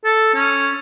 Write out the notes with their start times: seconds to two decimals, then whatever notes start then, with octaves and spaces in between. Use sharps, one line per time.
0.05 A4
0.35 C#4